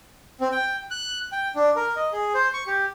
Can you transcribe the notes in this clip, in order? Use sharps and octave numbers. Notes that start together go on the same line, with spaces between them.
C4
G5
F#6
G5
D4
A#4
D#5
G#4
C5
C#6
G4